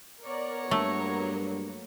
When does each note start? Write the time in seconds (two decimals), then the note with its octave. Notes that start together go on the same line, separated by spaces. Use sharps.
0.22 B3 A#4 C#5 D5 A#5
0.71 G2 F#3 A3 A#3